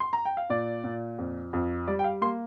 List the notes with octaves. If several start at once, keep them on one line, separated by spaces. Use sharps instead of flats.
C6
A#5
G5
F5
A#2 D5
A#2
F2
F2
G3 D5
G5
F5
A#3 C6